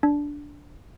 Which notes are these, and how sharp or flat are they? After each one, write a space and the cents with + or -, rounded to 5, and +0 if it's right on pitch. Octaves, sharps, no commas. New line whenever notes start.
D4 -10